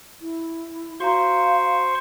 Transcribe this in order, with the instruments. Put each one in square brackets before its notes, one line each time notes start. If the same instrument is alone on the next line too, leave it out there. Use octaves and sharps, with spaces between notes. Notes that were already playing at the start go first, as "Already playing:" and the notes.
[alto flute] E4
[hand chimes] F#4 A#5 [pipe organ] C5 C6 C#6 [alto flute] F5